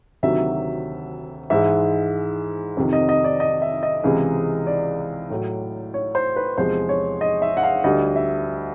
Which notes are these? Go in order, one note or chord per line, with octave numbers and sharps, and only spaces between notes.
D2 C3 D#3 F#3 E5
G#2 E3 G#3 E5
F2 C3 D#3
D#5
D#5
D5
D#5
E5
D#5
C#2 C3 E3 G#3
D5
A2 F#3
C#5
C5
B4
E2 C3 F3 G#3 C5
C#5
D#5
E5
F#5
F5
D2 D3 G3 D#5
E5